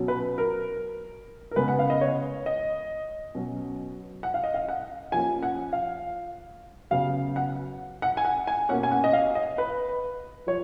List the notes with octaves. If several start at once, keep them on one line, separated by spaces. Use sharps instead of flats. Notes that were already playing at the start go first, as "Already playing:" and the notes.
Already playing: B2 F#3 C#4
B4
A#4
A#4
C#3 G#3 B3 B4
F#5
F5
D#5
C#5
D#5
B2 F#3 C#4
F#5
F5
D#5
F5
F#5
F3 A#3 C#4 G#5
F#5
F5
C#3 F#3 B3 F5
F#5
F#5
G#5
F#5
G#5
B2 A#3 C#4 F#5
G#5
F#5
D#5
F5
D#5
B4
F3 C#5